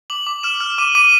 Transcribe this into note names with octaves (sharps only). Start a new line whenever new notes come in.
D6 F#7
D6
F6 E7
F6
D6 D#7
D6 D#7